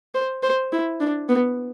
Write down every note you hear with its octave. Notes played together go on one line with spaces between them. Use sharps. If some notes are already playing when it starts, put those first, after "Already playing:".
C5
C5
E4
D4
B3